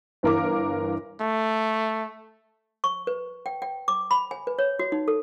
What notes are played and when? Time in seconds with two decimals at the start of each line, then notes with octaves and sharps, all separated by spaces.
0.23 G1 E3 A#4 F5 D6
1.20 A3
2.84 C#6
3.07 B4
3.46 G5
3.62 G5
3.88 D6
4.11 B5
4.31 G#5
4.47 B4
4.59 C#5
4.79 F#4
4.92 D#4
5.08 A4